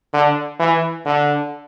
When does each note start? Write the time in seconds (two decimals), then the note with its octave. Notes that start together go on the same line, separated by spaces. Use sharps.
0.13 D3
0.59 E3
1.05 D3